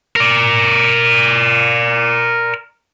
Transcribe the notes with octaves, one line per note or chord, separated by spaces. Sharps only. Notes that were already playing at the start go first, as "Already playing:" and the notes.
A#4 D5